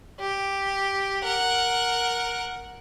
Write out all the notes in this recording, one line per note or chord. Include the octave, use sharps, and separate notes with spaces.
G4
A#4 F#5